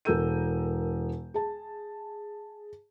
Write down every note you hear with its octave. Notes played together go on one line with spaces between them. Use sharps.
E1 A4 A#4 E6 G6 D#7
G#4 A5